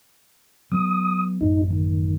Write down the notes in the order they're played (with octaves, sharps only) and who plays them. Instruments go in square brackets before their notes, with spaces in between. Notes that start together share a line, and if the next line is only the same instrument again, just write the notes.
[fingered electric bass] F#3 B3 [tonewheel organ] D#6
[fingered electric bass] A1 F#2 [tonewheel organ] D#4
[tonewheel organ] D#3